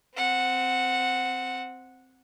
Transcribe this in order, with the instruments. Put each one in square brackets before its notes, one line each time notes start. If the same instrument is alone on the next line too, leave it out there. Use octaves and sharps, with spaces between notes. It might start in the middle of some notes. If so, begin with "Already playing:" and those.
[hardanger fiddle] C4 F#5